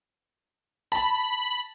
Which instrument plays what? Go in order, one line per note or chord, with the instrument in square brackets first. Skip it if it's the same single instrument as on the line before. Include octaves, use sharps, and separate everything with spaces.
[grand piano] A5 [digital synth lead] B5